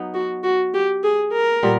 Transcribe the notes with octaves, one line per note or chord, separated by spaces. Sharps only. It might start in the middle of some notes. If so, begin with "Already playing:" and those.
Already playing: F#3 B3 D#4
F#4
F#4
G4
G#4
A#4
A#2 G3 B3